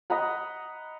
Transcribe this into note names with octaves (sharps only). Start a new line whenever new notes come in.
D#5 F#5 A#5 B5